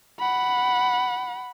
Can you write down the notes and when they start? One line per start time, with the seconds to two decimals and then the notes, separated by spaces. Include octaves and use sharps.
0.19 F#5 B5